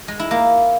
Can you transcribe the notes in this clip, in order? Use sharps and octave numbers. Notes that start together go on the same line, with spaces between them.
G#3
E4
A#3